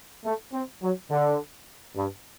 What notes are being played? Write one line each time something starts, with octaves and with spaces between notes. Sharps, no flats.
A3
C4
F#3
D3
G2